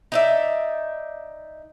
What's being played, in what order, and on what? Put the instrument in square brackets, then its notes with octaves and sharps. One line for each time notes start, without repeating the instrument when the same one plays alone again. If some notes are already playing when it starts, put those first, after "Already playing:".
[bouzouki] D#4 D5 E5